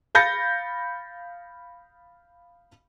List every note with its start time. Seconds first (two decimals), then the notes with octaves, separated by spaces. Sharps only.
0.15 F5 B5 G6 A6 A#6 C#7